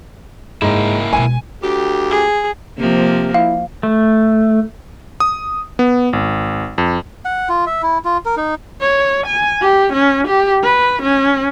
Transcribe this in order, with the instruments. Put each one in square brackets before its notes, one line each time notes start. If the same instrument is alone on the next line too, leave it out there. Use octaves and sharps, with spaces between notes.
[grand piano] G#2 [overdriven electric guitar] A#3 E4
[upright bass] B2 G#3 [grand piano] G#5
[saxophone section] D2 G4
[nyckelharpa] G#4
[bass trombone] C3 [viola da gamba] F3 A#3
[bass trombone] E4 [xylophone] F5
[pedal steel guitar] A3
[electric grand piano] D#6
B3
G#1
F2
[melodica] F#5
F4
E5
E4
F4
A#4
D#4
[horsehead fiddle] C#5
G#5
G4
C#4
G4
B4
C#4